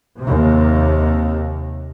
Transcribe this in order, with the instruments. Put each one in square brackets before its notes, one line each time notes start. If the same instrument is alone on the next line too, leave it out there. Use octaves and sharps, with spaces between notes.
[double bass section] D#2 C3